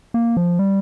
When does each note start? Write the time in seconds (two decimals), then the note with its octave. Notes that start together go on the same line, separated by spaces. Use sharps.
0.14 A#3
0.37 F3
0.59 G3